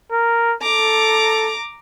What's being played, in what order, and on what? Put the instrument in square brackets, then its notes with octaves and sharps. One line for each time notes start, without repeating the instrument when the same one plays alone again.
[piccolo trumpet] A#4
[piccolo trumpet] A4 [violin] A#5 D6